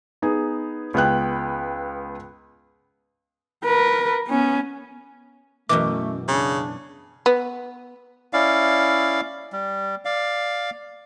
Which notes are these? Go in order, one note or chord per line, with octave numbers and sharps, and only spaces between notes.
B3 D#4 G#4
C#2 B3 G5 F#6
A#4 B4
B3 C#4
F#2 B2 E3 A3 D6
C#3 D4
B3
C#4 E4 D5 F5
G3
D5 F5